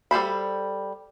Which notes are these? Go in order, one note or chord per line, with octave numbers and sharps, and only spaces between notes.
G3 A4 C5 B5